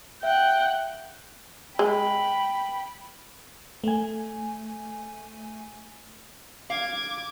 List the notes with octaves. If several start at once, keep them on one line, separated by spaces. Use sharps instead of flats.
E5 F#5 G5
G#3 G5 B5
A3 G#5
F5 D6 G#6